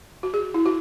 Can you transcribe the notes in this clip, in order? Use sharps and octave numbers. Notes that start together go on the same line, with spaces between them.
F#4
G#4
E4
F#4